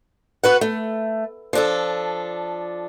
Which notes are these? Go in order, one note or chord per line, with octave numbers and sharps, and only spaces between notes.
F#4 B4 F#5
A3
F3 D4 A4